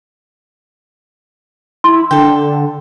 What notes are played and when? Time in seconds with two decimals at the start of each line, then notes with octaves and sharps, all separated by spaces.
1.84 E4 C6
2.11 D3 A4 G5